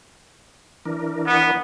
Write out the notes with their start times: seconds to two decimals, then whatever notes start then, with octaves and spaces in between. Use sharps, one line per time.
0.85 E3 D4 A#4
1.27 B3